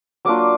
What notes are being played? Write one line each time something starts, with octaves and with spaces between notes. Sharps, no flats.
F#3 A#3 D4 F4 D6